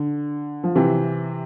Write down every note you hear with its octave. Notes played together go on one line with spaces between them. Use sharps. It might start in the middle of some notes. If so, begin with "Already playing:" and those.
Already playing: D3
F3
C3 E3